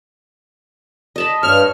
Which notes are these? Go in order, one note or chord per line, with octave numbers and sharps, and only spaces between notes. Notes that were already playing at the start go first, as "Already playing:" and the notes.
D#5 A5 B5
G2 C#5 F6